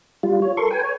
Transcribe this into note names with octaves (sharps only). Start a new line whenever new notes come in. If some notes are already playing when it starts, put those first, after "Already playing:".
G3 F4
C#5
A4 A#4 C6 C#6
B4 G5 G#5
C#5 G#5